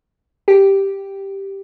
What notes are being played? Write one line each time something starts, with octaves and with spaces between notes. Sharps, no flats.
G4